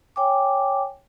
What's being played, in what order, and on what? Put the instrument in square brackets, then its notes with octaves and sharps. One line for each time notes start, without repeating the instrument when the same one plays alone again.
[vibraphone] C#5 G5 G#5 D6